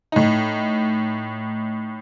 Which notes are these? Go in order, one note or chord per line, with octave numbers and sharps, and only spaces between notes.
A2 D#4